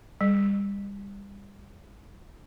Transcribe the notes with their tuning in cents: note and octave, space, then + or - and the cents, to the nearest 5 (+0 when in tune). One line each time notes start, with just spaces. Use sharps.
G3 +30